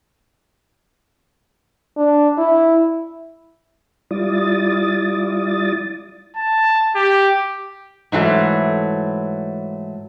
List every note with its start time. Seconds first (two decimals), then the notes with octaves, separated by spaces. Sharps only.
1.97 D4
2.38 E4
4.11 G3 E4 F4 D5 D#6 A6
6.37 A5
6.96 G4
8.12 G#2 E3 F#3 A3